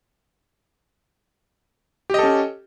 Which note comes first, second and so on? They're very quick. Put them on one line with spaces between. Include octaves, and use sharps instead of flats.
G4 D#5 A4 C#4